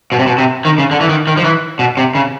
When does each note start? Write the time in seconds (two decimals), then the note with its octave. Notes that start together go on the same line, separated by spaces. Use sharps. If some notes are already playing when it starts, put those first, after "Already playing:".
0.12 B2
0.19 C3
0.27 B2
0.38 C3
0.65 D#3
0.78 C#3
0.91 D3
1.01 E3
1.09 D#3
1.27 D#3
1.37 F3
1.44 E3
1.79 B2
1.97 C3
2.15 C#3